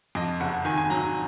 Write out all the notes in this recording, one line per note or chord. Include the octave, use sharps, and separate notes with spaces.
F2 D#5
F#1 F#5
D#3 G#5
G#5
F#3 A#5